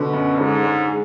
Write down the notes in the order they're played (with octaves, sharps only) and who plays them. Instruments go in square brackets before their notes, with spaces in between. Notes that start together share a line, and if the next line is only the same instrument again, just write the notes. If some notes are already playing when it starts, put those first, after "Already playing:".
Already playing: [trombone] B2 [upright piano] D3
[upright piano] F#2
[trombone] G#2 [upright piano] D3
[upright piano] G#3
G#4